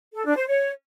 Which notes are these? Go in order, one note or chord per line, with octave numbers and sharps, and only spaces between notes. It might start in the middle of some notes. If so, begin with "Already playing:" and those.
A4
D4
C5
C#5